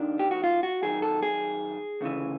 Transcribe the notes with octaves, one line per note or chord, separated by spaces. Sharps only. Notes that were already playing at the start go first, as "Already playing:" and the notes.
Already playing: D#2 D#3 D4
G4
F#4
F4
F#4
F#2 D#3 G#4
A4
G#4
D2 C#3 E3